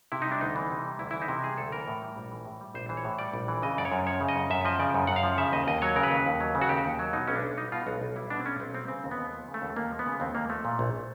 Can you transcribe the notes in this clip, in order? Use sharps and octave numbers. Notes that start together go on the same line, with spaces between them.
C3 E4
D#4
G3 D4
D2 D#4
E3
C3
G3
D2 E4
E3 E4
D#4
C3
G3 G#4
D2 A4
E3 A#4
A2
G3
A#1
E3
A2
G3
A#1 C5
E3 C5
C#5
A2
G3 D5
A#1
E3
C#3 D#5
F#2 D5
C#5
F#2
F3 C#5
C#3
D#5
F#2
F#2 E5
F3 D#5
C#3 D5
F#2
F#2 F#5
F5
F3
C#3 E5
D#2 D#5
D#2 D#5
F#3 C#5
C#3 A#4
B4
D#2
D#2
F#3
C#3
F#4
D#2 G4
D#2
F#3
B2 D#4
B1 C#4
D4
B1
G3 D#4
B2 F4
B1 F#4
B1
G3 E4
B2 D4
C4
B1 C#4
B1 C4
G3 C4
C#3 C4
D#2
B3
D#2
F3
C#3
A3
D#2
D#2 A#3
F3
B3
C#3
D#2 C4
D#2 A#3
F3 A3
A#2
A#1